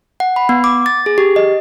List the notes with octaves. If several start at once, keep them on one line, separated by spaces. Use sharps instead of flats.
F#5
B5
B3
D6
A6
G#4
G4
D#5